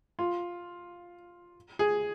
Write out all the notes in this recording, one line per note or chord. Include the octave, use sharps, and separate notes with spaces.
F4
G#4